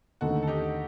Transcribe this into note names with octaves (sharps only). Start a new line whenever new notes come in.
D#2 D3 A3 C4 D#4 F#4 A4
A4
D#4 G4